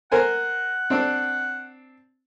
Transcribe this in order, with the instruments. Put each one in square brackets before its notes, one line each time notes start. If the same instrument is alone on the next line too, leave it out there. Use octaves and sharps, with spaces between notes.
[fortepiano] A#4 C5 G#5 [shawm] F#5
[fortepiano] C4 D4